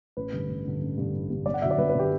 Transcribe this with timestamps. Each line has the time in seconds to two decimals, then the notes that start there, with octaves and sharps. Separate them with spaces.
0.17 A1 B4
0.33 G2 D3
0.49 A1
0.65 G2 D3
0.81 A1
0.98 G2 D3
1.14 A1
1.30 G2 D3
1.46 G1 D5
1.54 F#5
1.62 F#2 D3 F#3 E5
1.71 D5
1.78 G1 B4
1.89 B4
1.95 D3 F#3 G4